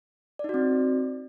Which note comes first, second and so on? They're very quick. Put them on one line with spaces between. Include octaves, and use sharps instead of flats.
D5 D#4 F#4 C4